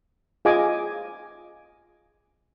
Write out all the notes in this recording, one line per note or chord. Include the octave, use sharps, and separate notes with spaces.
F4 G#4 D#5 G#5 D6